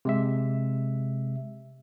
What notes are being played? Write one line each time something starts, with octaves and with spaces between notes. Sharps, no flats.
C3 G#3 E5